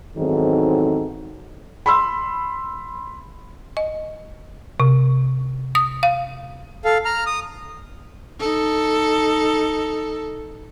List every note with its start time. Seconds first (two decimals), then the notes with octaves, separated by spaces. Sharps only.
0.17 E2 G#2 D#3 F#3 C4 A4
1.86 B5 C6 E6
3.77 D#5
4.80 C3
5.75 D#6
6.03 F5
6.85 A4 F5
7.05 A#5 F6
7.26 D#6
8.40 D#4 A4